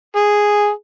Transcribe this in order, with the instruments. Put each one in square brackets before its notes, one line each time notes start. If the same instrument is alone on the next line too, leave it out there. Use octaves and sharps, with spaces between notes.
[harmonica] G#4